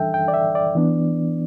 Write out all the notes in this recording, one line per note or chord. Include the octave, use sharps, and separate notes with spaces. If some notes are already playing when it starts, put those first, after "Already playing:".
Already playing: E3 G3 D4 A4 E5 G5
G5
D5
E5
D5
E3 B3 D4